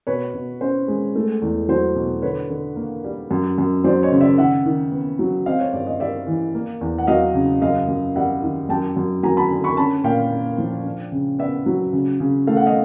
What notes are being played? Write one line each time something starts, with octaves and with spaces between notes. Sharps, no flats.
B2 B4 C#5
B2
C#4 C5
G#3
A3
E2
F#3 C5
B2
D3 B4 C#5
D3
A#3
G3
F#2
F#2
F#3 C5 D5
C#5 D#5
C#3
D5 E5
D#3 E5 F#5
D#3
B3
F#3
C4 D#5 F5
C#5
G2 D5
D#5
G3 D5 E5
E3
A#3
E2
F#5
F#3 D#5 F5
C#3
F#2 D#5 F5
F#2
G3 E5 F#5
D#3
F#2 G5 A5
F#2
F#3 G#5 A#5
A5 B5
D3
B5 C#6
C#4 A5 B5
A#2 F5 G5
A#3
F3
D4
C#3
B3 D5 E5
F#3
C#3
C#3
A3 F5
F#5
D#5 F5